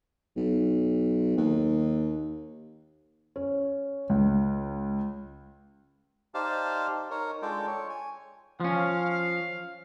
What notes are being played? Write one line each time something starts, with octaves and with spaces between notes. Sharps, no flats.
B1
D#2
C#4
C#2
D#4 G4 C5 D5 F5 A5
D#4 A#4 C#5
G#3 D4 F4 A4 D5 G5
C#5
G#5
F3 C#4 F5